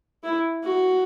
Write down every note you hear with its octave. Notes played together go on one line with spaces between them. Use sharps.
E4
F#4